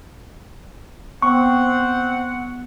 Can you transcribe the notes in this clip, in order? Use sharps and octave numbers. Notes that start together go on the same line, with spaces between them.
B3 C4 F#5 C#6